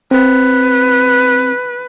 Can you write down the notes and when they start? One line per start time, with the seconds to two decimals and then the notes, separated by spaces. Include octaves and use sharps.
0.11 C4 B4